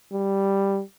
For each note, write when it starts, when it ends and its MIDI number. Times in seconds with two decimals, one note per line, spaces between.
0.12 0.81 55